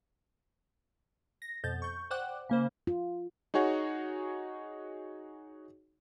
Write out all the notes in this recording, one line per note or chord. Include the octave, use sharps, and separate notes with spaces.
A#6
F2 B2 G6 A6
C#6 G6
C5 D5 F#5 G5 D6 F#6
C#3 A#3 C5
F4
D#4 F#4 G#4 C#5 F#5